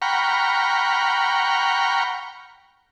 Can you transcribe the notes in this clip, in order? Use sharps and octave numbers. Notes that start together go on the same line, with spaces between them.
F#5 G5 A#5 B5 C#6 F6